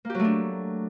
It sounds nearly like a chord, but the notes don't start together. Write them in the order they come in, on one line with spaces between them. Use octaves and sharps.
A#3 G4 F#3 A3 D4